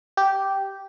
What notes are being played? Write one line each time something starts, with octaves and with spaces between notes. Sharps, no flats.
G4